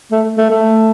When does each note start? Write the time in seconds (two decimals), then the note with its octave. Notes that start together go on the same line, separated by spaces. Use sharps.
0.12 A3
0.38 A3
0.50 A3